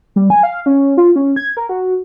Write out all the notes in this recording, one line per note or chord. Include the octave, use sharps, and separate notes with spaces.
G3
G#5
F5
C#4
F4
C#4
G#6
A#4
F#4